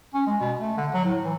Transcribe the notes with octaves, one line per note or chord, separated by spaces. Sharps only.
C#4
G#3
B2
A3
D3
F#3
A2
E3